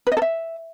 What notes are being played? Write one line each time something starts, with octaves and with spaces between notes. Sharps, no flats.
B4
D#5
A4
E5